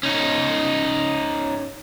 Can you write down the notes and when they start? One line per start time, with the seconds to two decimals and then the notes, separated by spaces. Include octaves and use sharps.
0.03 C#4 D#4